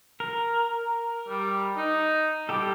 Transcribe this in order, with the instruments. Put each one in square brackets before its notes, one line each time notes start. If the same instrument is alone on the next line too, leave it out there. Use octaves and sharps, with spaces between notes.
[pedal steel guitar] A#4
[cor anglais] G3
D#4
[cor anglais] G3 [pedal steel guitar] G4 A4